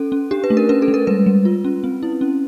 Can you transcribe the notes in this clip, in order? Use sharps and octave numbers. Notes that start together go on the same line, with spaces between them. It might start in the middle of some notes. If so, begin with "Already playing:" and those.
Already playing: C#4 A4
C#4
D4 G4
B4
A3
A#4
C#4 B4
A4
G#3
A#4
G3 B4
G3
F4
C#4
C4
E4
C#4